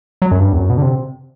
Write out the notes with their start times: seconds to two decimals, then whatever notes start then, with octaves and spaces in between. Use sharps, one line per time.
0.22 F#3
0.32 F#2
0.39 G2
0.53 E2
0.58 F#2
0.70 B2
0.77 D3
0.82 C3